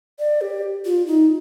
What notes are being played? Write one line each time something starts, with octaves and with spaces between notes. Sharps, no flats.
D5
G4
F4
D#4